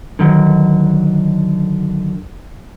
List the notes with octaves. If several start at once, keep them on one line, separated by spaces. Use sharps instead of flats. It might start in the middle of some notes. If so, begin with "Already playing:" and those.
D3 D#3 F#3